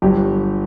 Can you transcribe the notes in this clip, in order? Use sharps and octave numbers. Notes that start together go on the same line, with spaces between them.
G1 G2 F#3 G4